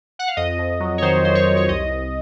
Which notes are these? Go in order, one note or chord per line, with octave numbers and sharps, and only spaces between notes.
F#5
F5
F2 D#5
F2
F#3
C#5
D#3 C5
F2 C5
C#5
F2
C#5
C2 D#5
C2